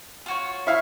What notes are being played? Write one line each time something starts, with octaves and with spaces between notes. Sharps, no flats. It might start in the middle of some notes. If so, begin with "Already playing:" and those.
F4 F#4 C#5
E4 F5